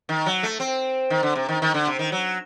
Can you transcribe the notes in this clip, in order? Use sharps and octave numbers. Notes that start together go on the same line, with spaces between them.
D#3
F#3
A3
C4
D#3
D3
C3
D#3
D#3
D3
C3
D#3
F#3